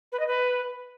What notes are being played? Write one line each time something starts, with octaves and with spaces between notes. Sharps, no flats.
B4
D#5
B4